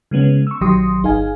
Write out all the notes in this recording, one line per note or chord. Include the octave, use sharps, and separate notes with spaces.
C#3 G#3 B3 C#4
C#6 E6
A#1 D#3 F#3 G4 C6 D#6
G1 D#4 G#4 F5 G#5